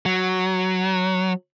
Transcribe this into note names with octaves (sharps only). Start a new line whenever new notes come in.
F#3